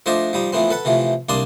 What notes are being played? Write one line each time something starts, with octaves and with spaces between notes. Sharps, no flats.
F3 A3 D4 C5 D5 D#5
F3 G3 D#4
E3 F3 A3 B3 C4
A4 B4 F#5
C3 E3 F3 A3
C2 A#3 D4 D5 C6 D#6